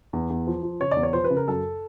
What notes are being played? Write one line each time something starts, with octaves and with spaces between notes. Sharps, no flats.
E2
E2
F3
F3
C#3 C#5
E2 D5
C#5
F3 C5
B4
C#3
A#4
F#2 A4